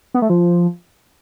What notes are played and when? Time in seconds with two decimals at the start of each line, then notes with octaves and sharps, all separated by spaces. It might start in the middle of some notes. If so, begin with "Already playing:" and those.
0.14 B3
0.22 A3
0.30 F3